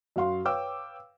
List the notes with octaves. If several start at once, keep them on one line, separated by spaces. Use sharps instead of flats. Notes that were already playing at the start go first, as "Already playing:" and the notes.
F#2 F#4 F5 C6
B4 C#5 F5 G5 D6 E6